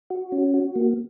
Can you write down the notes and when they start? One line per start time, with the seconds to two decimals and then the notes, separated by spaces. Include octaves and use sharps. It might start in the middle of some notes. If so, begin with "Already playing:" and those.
0.10 F#4
0.32 C#4
0.54 F#4
0.76 A#3